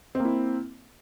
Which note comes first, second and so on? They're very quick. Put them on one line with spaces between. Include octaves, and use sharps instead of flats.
C4 A#3 E4